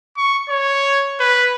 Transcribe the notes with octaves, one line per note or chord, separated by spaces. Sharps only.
C#6
C#5
B4